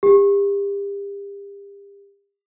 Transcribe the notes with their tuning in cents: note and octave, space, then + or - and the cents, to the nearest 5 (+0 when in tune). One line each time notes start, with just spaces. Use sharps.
G4 +35